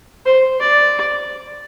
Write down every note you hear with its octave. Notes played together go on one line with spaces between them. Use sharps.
C5
D5